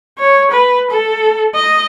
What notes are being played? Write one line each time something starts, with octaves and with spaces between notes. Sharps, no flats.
C#5
B4
A4
D#5